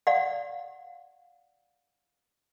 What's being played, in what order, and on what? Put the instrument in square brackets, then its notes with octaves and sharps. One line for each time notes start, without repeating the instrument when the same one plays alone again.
[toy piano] D5 F5 F#5